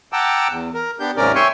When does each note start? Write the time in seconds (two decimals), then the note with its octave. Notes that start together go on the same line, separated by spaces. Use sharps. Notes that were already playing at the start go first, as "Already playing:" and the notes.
0.13 F#5 G5 A5 A#5 D6 E6
0.49 E2
0.74 A#4
1.00 B3 D4 G4 G6
1.17 D#2 G#2 C3 C#4 A#4 D5
1.35 C#5 E5 G5 G#5 C6 C#6